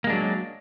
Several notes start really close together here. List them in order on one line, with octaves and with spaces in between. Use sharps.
A#3 G#3 D4 F#3